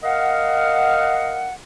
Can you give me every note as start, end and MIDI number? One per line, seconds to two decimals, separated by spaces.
0.04 1.54 70
0.04 1.54 75
0.04 1.54 77
0.04 1.54 78